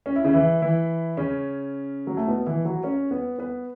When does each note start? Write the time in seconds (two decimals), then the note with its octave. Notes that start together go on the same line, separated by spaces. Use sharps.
0.06 C#4
0.16 E4
0.24 C#3 C#4
0.33 E3 E4
0.62 E3 E4
1.17 C#3 C#4
2.07 F#3
2.17 A3
2.28 B2 B3
2.46 E3 E4
2.65 F#3 F#4
2.84 C#4 C#5
3.11 B3 B4
3.39 B3 B4